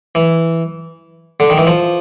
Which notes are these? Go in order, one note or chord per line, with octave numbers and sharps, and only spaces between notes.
E3
D3
D#3
E3
F3